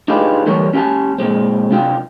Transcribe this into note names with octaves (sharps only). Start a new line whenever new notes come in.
D4 D#4 F4 G4 G#4 B4
D3 E3 G3 G4 A#4 C#5
C#4 G4 F#5 G#5 A5
A#2 G#3 C4
C3 D4 F4 G5